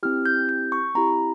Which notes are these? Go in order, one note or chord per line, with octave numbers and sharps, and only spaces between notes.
C4 E4 G4 F6
G6
G6
C#6
C4 E4 G4 A#5